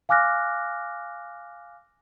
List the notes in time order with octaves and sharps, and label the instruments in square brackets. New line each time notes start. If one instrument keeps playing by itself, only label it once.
[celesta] F5 G#5 D6 F6 F#6 A#6